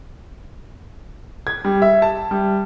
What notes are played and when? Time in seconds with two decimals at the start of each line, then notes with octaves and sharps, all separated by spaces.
1.47 G#6
1.65 G3
1.82 E5
2.02 A5
2.31 G3